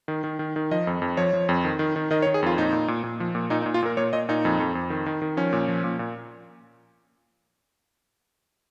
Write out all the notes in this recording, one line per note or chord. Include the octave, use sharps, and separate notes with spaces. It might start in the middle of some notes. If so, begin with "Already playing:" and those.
D#3
D#3
D#3
D#3
F3 D#5
F2
F2
F3 C#5
F3
F2
D#3
D#3
D#3
D#3 D#5
C#5
D#3
G#4
F2 F4
A#2 D#4
A#2
A#2
A#2
F3
A#2
A#2 D#4
D#4
A#2
F4
A#2 A#4
A#2 C#5
A#2 D#5
A#2 D#4
F2
F2
F2
D#3
D#3
D#3
F3 C#4
A#2
F3
A#2
A#2